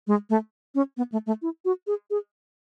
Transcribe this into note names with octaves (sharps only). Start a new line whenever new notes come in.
G#3
A3
C#4
B3
A3
A3
E4
F#4
G#4
G#4